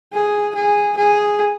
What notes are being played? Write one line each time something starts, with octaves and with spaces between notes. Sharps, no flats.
G#4
G#4
G#4